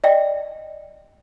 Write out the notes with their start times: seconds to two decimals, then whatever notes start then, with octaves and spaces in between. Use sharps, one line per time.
0.04 D5 D#5 G5